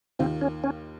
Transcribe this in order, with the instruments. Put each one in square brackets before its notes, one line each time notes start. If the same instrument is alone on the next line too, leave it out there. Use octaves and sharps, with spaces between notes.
[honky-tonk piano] D#2 D#3 A#3 F4 [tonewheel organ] C4
[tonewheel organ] C#4
C#4